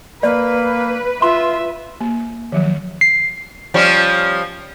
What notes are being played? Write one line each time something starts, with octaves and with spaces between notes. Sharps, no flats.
A#3 B4 D5
F4 E5 C6
A#3
D#3 F3 F#3
C7
F3 G3 C#4